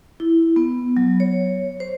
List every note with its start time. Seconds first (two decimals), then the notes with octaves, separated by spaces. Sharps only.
0.20 E4
0.56 B3
0.97 F#3
1.20 C#5
1.80 C5